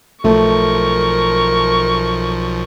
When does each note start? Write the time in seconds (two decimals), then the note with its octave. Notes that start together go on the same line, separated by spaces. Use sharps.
0.24 B1 F3 A3 A#4 C#6